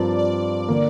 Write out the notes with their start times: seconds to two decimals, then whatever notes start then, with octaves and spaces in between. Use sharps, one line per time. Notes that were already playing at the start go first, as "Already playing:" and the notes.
Already playing: G2 F3 C4 F4 A#4 D5
0.18 D5
0.68 D3 A#3